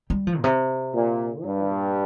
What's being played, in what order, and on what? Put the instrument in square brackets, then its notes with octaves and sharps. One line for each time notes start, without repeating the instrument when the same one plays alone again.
[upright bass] G3
F3
A#2
C3
[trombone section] A#2
[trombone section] G2 [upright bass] G3
[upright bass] A#2